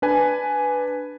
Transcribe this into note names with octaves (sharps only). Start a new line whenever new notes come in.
D4 B4 G#5